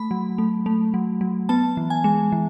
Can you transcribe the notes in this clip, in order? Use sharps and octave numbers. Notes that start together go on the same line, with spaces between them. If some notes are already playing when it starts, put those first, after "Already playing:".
Already playing: A3 B5
F#3
A3
A3
F#3
F#3
B3 A5
E3
G#5
G#3
E3